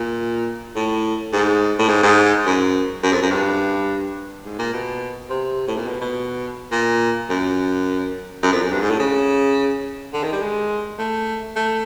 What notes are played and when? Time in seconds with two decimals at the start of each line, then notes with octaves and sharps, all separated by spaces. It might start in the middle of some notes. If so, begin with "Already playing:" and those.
Already playing: A#2
0.76 A2
1.33 G#2
1.79 A2
1.88 G#2
2.03 G#2
2.46 F#2
3.03 F#2
3.12 F2
3.22 F#2
3.31 G2
4.45 G#2
4.59 A#2
4.73 B2
5.30 C3
5.68 A2
5.77 A#2
5.87 B2
6.01 B2
6.72 A#2
7.30 F#2
8.43 F#2
8.52 F2
8.62 F#2
8.71 G2
8.81 G#2
8.90 A2
8.99 C#3
10.13 D3
10.23 D#3
10.32 G3
10.42 G#3
10.98 A3
11.56 A3